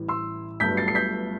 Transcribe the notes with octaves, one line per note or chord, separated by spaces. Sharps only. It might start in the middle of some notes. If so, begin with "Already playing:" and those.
Already playing: A1 A2 E3 G3
C6 E6
G1 G2 F#3 A3 G6 B6
A6 C7
C7
G6 B6